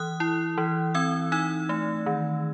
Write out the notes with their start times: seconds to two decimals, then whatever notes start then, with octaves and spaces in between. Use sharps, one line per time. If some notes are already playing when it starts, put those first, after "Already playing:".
Already playing: E3 D#6 F#6
0.20 E4
0.58 E3
0.94 C4 E6 G#6
1.32 D#4 E6 G#6
1.69 A3
2.06 D#3